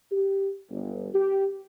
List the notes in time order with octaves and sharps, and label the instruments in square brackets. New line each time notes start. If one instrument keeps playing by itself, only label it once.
[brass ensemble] G4
G1
G4